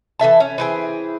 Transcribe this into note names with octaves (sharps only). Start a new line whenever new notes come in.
E3 A4 E5 A5
C#4
E3 C4 G#4